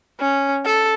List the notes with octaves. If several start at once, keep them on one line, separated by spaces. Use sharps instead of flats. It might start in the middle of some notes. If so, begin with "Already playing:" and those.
C#4
A4